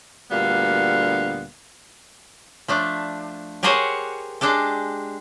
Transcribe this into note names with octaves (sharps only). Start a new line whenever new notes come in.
D2 A#2 D3 G3 B3 F5
F3 A3 D4
G4 G#4 A#4 C5 C#5 F#5
G#3 D4 G4 A4